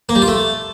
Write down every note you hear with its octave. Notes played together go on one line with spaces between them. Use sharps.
A#3
G3
F4
A3